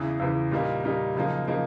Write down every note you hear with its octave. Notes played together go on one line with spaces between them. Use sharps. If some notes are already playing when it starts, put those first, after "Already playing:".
Already playing: E2 C#3 E3
E2 C#3 E3
A#2 G3 A#3 D#4
A#2 G3 A#3 D#4
F#2 C#3 F3 A#3 D#4
C#3 F3 A#3 D#4